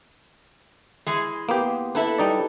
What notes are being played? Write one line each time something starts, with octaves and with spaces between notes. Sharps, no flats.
E3 G#3
A#3 B3 G4
E4 A4 B4
G3 D#4 D5